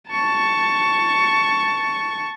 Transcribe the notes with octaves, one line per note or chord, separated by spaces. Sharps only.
A5 C#6